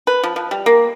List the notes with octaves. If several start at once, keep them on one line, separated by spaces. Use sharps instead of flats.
B4
F3
F3
G3
A#3